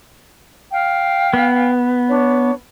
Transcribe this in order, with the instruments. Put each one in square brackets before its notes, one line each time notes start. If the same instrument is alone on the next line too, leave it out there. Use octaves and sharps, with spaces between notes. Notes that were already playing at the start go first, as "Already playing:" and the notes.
[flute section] F5 G5
[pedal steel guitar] B3
[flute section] D4 C#5